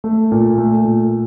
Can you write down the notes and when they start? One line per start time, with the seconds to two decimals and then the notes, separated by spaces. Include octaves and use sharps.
0.04 A3
0.32 A#2
0.58 A3
0.85 A#2